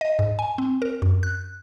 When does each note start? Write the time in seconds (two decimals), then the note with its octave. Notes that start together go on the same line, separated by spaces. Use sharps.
0.01 D#5
0.19 G#2
0.39 G#5
0.58 C4
0.82 A#4
1.02 F#2
1.23 F#6